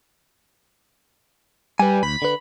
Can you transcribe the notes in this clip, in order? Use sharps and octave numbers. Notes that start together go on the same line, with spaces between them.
G3 B4 G#5
D2 B5
D3 B4